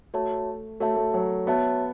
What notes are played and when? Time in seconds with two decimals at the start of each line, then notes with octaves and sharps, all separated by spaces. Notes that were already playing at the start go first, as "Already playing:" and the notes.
0.14 A3 F#4 C#5 E5 A5
0.80 A3 F#4 C#5 E5 A5
0.96 A3
1.14 F#3
1.47 B3 F#4 C#5 E5 A5